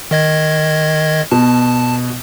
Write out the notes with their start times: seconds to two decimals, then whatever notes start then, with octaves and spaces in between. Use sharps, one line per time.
0.11 D#3 D#5 G#6
1.32 B2 A5